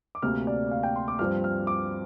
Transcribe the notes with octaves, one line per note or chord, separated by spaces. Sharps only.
D6
D2 C3 A#3 F6
D5
F5
G5
C6
D6
G2 F3 C4 F6
F6
D6